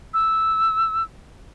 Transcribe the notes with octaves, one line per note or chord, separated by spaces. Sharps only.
E6